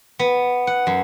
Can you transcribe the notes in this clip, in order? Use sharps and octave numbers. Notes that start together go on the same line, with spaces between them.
B3
F#5
F#2